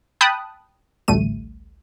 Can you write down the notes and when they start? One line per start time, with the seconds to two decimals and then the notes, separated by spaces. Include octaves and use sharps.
0.21 G5 A5 B5 D#6 F#6
1.08 A1 D2 G3 A3 D#7